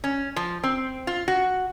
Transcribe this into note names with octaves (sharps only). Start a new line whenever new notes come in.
C#4
F3
C4
F4
F#4